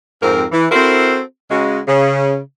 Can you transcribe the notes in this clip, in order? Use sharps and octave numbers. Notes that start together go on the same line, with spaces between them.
F2 G#2 F3 C4 A#4
E3
C4 E4 F#4 A4 A#4 C5
C#3 G#3 F#4
C#3